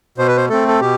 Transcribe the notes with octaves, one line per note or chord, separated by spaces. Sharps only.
B2 C5
B4
C5
A3 C4 A4
A4
B2 G4